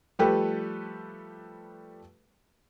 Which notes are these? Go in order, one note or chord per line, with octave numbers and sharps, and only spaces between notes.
F3 G3 A3 G4 A4 B4